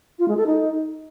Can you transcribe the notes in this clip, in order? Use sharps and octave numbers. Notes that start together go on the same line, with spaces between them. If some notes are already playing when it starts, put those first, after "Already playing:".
F4
G#3
A4
D#4